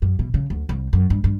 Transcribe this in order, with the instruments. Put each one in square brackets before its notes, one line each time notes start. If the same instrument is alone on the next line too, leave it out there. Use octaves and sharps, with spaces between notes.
[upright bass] F#2
B2
C#3
D2
C2
F#2
G2
G2